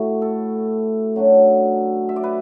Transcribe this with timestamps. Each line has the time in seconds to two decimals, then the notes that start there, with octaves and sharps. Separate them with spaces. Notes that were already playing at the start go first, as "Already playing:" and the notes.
Already playing: A2 A3 E4 F#4
0.22 A4
1.16 F#2 F#3 A3 D4
2.09 E5
2.16 D5
2.23 B4